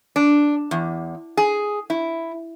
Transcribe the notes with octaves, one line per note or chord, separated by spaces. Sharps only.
D4
E2
G#4
E4